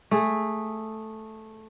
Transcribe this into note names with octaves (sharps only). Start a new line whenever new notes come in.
A3 G#4